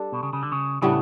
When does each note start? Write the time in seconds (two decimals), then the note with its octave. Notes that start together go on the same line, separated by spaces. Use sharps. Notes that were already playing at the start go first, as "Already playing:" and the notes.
Already playing: G3 D4 A4
0.12 B2
0.23 C#3
0.33 C#3
0.43 D3
0.52 C#3
0.82 A2 C#3 G3 B3 D4